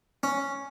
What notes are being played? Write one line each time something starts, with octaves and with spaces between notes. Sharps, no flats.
C#4